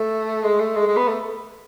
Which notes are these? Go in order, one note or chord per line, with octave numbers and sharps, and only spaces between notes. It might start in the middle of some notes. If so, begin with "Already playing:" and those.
Already playing: A3
G#3
A3
G#3
G#3
B3
A3